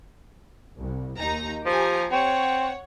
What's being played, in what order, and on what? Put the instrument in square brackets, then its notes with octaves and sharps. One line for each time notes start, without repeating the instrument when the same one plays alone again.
[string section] C2
D#2 D#4 A#5
[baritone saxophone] F3 [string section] G4 G#5 A#5
[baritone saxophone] C4 [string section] C#5 F#5